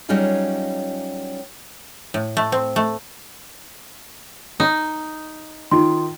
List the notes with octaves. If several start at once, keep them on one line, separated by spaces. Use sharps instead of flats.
F#3 G3 C#4 D#4 F4 G#4
A2
A3
C4
A3
D#4
D#3 F4 C6